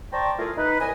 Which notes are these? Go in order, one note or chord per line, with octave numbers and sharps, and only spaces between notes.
C5 D5 G5 A5 A#5 C#6
A3 E4 F4 G#4 A#4
D#4 B4
C2 D#5 G#5